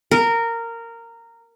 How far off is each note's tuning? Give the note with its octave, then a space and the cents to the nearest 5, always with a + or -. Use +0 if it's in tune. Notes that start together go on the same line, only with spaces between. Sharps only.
A#4 -15